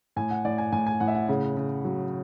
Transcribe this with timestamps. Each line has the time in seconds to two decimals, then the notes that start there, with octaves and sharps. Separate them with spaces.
0.16 A2 G#5
0.31 F#5
0.45 A2 D5
0.58 G#5
0.72 A2 G#5
0.87 G#5
1.00 A2 F#5
1.08 E5
1.15 F#5
1.29 C#3
1.57 C#3
1.85 F#3